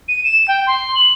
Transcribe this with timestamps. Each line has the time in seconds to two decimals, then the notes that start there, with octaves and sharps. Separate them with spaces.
0.08 D#7
0.24 E7
0.48 G5
0.67 C6
0.95 F#7